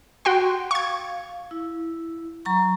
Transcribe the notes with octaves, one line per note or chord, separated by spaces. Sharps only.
F#4 G5 C6
F5 C#6 G#6
E4
F#3 A#5 C#6